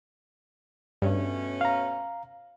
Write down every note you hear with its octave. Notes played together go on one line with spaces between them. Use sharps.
G2 B2 A3 C#4
F5 A#5